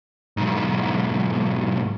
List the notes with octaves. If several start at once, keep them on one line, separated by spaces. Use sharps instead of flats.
B1 G#2